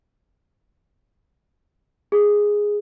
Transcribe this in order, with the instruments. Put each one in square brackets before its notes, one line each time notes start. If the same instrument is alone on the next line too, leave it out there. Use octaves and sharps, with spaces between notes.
[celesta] G#4